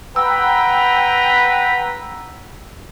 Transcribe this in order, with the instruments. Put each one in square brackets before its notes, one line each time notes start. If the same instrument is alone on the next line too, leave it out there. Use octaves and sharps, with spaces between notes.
[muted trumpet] B4 [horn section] F#5 G5 A#5 [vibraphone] E6